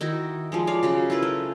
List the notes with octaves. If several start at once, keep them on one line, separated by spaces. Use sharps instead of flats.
D#3 D#4 E4 F#4
F3 G3 G#3
C#5 D5 F5
C#3 F#3 F#4
E4 F4 A#4 B4
A3